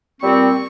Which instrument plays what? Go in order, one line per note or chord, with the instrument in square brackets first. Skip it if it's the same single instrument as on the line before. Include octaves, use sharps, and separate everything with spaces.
[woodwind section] A#2 G3 C4 [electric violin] C#6